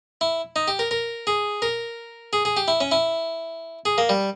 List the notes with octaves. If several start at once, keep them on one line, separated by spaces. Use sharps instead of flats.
E4
D#4
G4
A#4
A#4
G#4
A#4
G#4
G#4
G4
E4
C#4
E4
G#4
A#3
G3